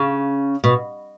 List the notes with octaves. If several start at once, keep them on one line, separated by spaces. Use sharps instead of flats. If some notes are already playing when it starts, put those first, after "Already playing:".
Already playing: C#3
B2